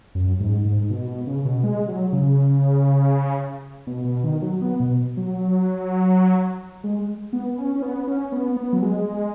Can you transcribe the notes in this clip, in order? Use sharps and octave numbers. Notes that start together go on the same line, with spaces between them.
F#2
G#2
G#2
B2
B2
C#3
B2
G#3
F#3
C#3
B2
B2
D#3
F#3
B3
B2
F#3
G#3
B3
C#4
C#4
B3
C#4
B3
B3
F#3
G#3